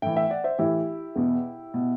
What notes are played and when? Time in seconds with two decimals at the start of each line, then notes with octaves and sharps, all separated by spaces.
0.02 A2 E3 E5 G5
0.16 E5 G5
0.30 D5 F#5
0.44 C5 E5
0.59 A2 E3 E4 G4
1.15 E2 B2
1.74 B2